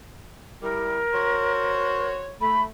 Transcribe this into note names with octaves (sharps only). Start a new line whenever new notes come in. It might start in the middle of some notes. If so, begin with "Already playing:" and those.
G3 E4 A#4
F#4 C5 C#5
A3 B5